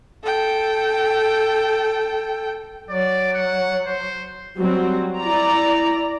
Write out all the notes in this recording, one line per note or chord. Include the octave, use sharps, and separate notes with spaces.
A4 G5
F#3 D5
F#5
C5
F#3 G3 C4 F#4
E4 D5 A#5